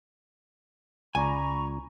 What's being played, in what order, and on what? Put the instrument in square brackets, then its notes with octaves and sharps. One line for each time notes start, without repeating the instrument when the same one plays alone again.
[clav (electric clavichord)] C#2 D5 [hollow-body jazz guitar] G#5 [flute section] A#5 B5 C#6